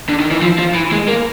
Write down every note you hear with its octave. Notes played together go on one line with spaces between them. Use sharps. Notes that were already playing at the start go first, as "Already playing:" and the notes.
D3
D#3
E3
F3
F3
E3
G#3
A#3